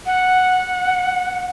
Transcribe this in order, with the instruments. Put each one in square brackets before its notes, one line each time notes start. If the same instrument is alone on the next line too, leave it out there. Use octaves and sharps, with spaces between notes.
[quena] F#5